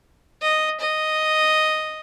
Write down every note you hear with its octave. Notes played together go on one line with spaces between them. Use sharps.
D#5
D#5